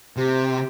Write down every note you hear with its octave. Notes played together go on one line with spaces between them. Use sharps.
C3 G4